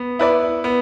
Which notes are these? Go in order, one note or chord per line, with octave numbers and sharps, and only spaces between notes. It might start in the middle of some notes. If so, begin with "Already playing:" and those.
Already playing: B3
E4 B4 D5
B3